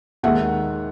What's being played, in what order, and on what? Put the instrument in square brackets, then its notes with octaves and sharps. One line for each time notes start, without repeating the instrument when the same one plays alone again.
[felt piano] D#2 D#3 G#3 E5 F#5